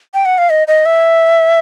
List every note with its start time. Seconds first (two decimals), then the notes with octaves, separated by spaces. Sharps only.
0.14 G5
0.25 F#5
0.38 F5
0.50 D#5
0.68 D#5
0.86 E5